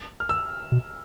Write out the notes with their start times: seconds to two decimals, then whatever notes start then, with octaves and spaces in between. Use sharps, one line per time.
0.20 F6
0.29 E6
0.72 B2